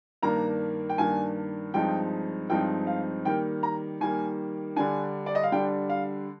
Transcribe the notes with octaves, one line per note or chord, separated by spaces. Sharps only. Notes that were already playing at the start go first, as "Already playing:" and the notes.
G2 D#3 A#3 D4 A#5
G5
G2 D#3 A#3 D4 G#5
G2 F3 G#3 C4 D#4 G5
G2 F3 G#3 C4 D#4 G5
F5
D#3 G3 A#3 G5
A#5
D#3 G3 A#3 G#5
D3 G3 D4 G#5
D5
D#5
F5
D3 G3 D4 G5
F5